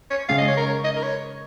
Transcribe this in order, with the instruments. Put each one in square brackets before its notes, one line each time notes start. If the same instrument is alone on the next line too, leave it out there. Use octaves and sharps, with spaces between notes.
[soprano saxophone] C#5
[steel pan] C#3 G#3 C#4 [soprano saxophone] F5
[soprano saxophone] D#5
C#5
A#4
C#5
D#5
A#4
C#5